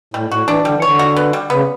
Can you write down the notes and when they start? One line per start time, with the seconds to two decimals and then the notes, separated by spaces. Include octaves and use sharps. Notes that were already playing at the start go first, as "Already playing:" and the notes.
0.14 A2 G3
0.31 A2 F#4
0.48 E3 D4
0.65 D3 G3
0.75 E3
0.82 D3 C#5
0.99 F#4
1.16 B3
1.33 G3
1.50 C#3 B3